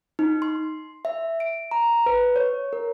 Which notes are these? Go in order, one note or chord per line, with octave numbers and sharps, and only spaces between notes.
D#4
C6
E5
D7
A#5
B4
C#5
A#4